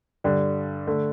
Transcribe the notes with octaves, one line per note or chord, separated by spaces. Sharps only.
G2 D3 G3
D3 A3